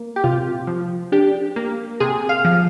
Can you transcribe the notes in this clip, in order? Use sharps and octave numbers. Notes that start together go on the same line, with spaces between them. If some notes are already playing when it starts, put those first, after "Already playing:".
Already playing: A#3
G4
C3 F4
F3
D4 G4
A#3
C3 G#4
F5
F3